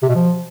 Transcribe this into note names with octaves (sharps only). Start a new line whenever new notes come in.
C3
B2
F3